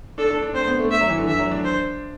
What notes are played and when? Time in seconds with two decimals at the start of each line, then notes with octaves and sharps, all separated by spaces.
0.18 D4 A4
0.30 D4
0.42 D4
0.54 C4 C5
0.67 B3
0.79 A3
0.91 E5
1.01 F#3
1.10 E3
1.18 D3
1.27 E3 E5
1.40 F#3
1.51 D4
1.64 C5